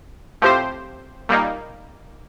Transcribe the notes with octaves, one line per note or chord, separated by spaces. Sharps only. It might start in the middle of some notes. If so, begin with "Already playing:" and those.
A2 F3 C4 G4 C5
A#2 G3 A#3 D#4